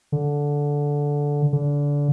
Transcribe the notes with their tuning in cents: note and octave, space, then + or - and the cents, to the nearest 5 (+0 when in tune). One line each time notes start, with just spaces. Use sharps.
D3 -10
D3 -25